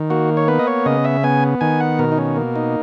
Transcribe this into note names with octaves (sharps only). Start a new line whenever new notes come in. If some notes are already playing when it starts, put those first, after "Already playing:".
Already playing: D#3
A#3 F#4
C#5
B3 B4
D#5
C#5
C#3 D#5
E5
B3 G#5
D#3 G#5
F#5
B2 A#4
D#4
C#4
A#3
D#4